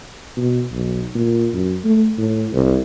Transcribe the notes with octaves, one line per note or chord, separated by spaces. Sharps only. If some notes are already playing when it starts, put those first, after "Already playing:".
B2
B1
A#2
F#2
A3
A2
C2